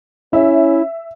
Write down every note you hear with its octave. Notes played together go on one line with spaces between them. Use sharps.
C#4 E4 E5